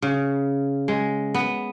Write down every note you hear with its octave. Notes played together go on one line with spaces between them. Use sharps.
C#3
G#3
B3